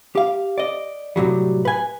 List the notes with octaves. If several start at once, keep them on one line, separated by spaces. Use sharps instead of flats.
G4 F5
D5 D#5
A2 C3 F#3 G3
B4 G#5